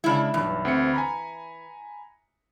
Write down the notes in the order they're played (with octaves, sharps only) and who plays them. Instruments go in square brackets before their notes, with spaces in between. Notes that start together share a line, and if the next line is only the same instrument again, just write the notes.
[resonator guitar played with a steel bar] C#3 E4 [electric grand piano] G#3 D4
[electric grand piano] B1 G2 [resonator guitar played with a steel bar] E3
[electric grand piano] D2 C4 C#7
G#5 A#5 B5